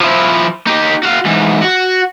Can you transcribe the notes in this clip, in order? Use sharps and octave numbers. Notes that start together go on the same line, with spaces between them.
F3 E4
D#4 G4
F#4 F5
G#2 E3
F#4